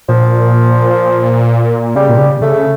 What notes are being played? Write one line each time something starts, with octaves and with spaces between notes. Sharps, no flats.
A#2 F3
C#3 G3
A#2
C#3
C#3 A3